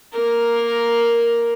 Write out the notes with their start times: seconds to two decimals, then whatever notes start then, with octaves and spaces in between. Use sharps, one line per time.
0.13 A#3 A#4